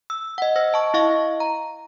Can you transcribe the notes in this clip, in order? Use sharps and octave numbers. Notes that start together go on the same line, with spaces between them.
E6
D#5 F#5
C5 E6 A#6
D#5 A5 C#6
E4 D#5 F5 C#6
A#5